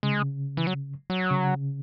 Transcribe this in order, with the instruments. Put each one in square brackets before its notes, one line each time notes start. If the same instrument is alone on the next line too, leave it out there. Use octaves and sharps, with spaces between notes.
[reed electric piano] C#3 [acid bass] G#3
[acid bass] E3
F#3
F#3
[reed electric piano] C#3